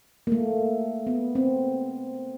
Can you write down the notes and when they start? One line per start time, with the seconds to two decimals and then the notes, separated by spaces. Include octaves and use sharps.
0.27 A#3
0.32 A3
1.07 B3
1.35 C4